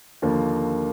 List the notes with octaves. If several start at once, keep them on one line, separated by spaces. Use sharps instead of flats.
D#2 D3 F3 A#3